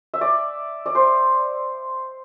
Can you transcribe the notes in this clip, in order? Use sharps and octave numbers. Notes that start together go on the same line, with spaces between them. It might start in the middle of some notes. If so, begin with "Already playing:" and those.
E5
D5
D5
C5